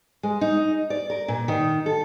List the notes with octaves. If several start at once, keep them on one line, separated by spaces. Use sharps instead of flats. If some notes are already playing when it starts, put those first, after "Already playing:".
G#3
D#4
D5
A#4
A#2
D#3
A4